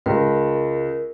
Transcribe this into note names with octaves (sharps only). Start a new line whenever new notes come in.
C#2 A#4